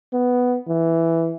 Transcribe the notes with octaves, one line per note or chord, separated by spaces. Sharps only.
B3
E3